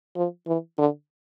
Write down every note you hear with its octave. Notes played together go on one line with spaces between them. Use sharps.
F3
E3
D3